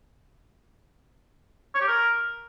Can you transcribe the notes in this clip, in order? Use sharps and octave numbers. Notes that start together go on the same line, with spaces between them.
C#5
G4
A#4